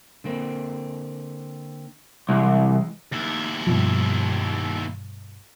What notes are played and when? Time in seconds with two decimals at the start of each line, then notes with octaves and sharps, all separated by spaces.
0.24 D3 A#3 C4
2.29 C2 E3 G#3
3.12 D#2 E4
3.67 G2 B2 F3